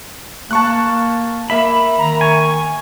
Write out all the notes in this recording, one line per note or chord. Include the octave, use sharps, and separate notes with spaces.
A#3 A5 C#6 F#6
A#3 E5 B5 B6
D#3 A#5
G#5 C#6